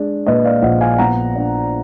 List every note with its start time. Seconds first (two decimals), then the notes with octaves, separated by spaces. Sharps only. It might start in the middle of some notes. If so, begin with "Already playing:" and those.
Already playing: G#3 D4
0.26 A#2 B4 D#5
0.44 D5 F5
0.62 A#1 D#5 F#5
0.81 F5 G#5
0.98 B3 F#5 A#5
1.36 D4